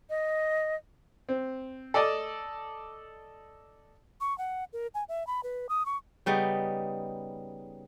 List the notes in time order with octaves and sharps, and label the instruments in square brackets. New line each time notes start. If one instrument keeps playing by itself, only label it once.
[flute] D#5
[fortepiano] C4
A4 D5 D#5 A5
[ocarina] C#6
F#5
A#4
G#5
E5
B5
B4
D#6
C#6
[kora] C#3 G3 B3 D#4